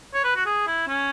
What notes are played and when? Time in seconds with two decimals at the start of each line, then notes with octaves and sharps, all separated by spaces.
0.14 C#5
0.24 B4
0.36 F#4
0.46 G#4
0.67 E4
0.88 C#4